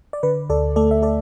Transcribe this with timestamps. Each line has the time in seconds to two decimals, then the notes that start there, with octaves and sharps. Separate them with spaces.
0.13 D5
0.23 D3 B4
0.50 D2 A4 D5
0.76 A3 A4 D5
0.91 E5
1.02 A4 D5